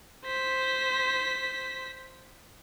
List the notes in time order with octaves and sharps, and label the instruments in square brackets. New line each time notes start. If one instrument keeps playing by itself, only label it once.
[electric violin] C5 B6